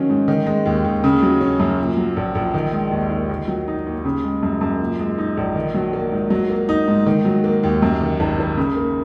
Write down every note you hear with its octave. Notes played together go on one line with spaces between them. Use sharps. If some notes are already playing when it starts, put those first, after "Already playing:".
Already playing: D#3 F#3 C#4
G#2
D#3
G#3
D#2
D#2
C#3
F#3
C#4
F#2
A#2
F#3
A#1
A#1
D#3
G#3
D#2
D#2
D#3
F#3
D#4
D#2
C#3
G#3
F#2
F#2
A#2
G#3
D#4
A#1
D#3
F#3
A#3
G#2
F#3
A#3
D#4
G#2
D#3
F#3
A#3
D#2
F#2
D#3
G#1
G#1
C#3
A#3